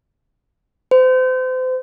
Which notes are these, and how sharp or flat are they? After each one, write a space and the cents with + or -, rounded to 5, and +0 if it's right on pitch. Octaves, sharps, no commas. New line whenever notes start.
C5 -35